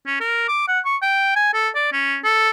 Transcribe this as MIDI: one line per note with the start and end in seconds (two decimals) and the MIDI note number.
0.06 0.20 61
0.21 0.46 70
0.48 0.65 86
0.68 0.80 78
0.85 0.96 85
1.02 1.32 79
1.36 1.50 80
1.54 1.69 69
1.75 1.88 74
1.92 2.17 61
2.24 2.50 69